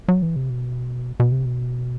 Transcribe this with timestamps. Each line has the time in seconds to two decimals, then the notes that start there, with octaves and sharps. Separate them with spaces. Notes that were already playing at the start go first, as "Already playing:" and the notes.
0.08 F#3
0.22 E3
0.36 C3
0.50 B2
1.20 B2
1.32 C3
1.45 B2